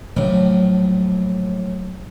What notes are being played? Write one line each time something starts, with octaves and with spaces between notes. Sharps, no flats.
A#1 A2 F3 F#3